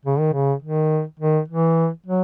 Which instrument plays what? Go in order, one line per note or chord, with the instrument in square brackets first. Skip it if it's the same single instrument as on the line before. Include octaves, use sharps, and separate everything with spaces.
[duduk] C#3
D#3
C#3
D#3
D#3
E3
F#3